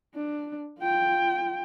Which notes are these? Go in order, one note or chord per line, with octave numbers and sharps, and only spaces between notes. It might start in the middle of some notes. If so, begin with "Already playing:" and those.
D4
F4 G5